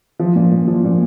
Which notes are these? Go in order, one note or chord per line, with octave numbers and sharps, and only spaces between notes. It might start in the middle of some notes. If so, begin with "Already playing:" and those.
F3
A#2
A#2
F3
A#2